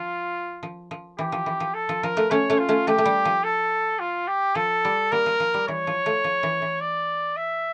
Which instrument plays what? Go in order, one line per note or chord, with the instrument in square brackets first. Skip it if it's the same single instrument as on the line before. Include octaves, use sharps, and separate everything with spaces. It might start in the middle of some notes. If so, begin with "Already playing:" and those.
Already playing: [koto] F3 [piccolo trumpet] F4
[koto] F3
F3
[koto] E3 [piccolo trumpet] G4
[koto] F3
E3
F3
[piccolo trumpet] A4
[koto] F3
[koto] F3 [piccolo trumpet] A#4
[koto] F3 A3
[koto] A3 C#4 [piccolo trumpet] C#5
[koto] A3 C#4
[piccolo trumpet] F4
[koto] A3 C#4
[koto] F3 A3 [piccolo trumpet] G4
[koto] A3
G3
F3
[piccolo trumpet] A4
F4
G4
[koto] F3 [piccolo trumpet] A4
[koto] G3
[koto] G3 A#3 [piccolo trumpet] A#4
[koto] F3
F3
G3
[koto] E3 [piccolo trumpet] C#5
[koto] F3
F3 A3
F3
E3
E3
[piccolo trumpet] D5
E5